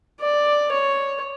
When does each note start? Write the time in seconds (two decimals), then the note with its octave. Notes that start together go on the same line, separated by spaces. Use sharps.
0.20 D5
0.72 C#5